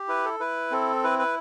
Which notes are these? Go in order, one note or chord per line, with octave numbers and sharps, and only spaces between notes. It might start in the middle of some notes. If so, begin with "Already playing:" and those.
Already playing: G4
E4 B4
A4
E4 B4
C4 A4
E4 B4
B4